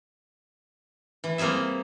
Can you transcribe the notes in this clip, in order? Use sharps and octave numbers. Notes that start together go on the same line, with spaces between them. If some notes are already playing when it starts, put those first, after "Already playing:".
E3
G3 A#3 C4 G#4 E5